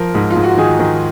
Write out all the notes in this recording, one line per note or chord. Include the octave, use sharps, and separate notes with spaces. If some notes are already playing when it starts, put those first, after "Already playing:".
Already playing: F3 A#4
G#2
F4
G#2
F#4
D#3 G#4
D#3